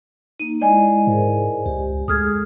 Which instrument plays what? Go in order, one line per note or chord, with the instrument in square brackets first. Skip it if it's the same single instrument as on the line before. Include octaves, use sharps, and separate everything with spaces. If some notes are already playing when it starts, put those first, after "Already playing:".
[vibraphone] A#3 D#4 [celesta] D#7
[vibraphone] G#3 E4 [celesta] D5 D#5 G#5
[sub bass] G#2 [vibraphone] G#4 A#4 C5
[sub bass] C#2 [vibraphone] G4
[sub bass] D2 [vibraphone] G#3 G#4 A4 [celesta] D#6 F6 G#6